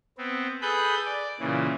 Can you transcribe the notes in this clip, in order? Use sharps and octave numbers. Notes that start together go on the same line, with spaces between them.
B3 C4
G#4 A4 B4 B5 F#6 G6
D5
A#2 C#3 E3